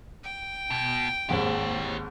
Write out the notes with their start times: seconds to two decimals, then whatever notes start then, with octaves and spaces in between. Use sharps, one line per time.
0.24 G5
0.70 B2
1.29 G#1 D#2 G#2 G4 C#5